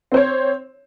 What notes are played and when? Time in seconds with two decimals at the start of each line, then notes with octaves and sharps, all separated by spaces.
0.12 C4
0.14 C5
0.17 C#5